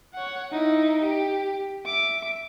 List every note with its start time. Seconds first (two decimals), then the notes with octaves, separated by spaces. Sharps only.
0.14 C#5 F#5
0.52 D#4 E4
1.02 G4
1.86 E5 D6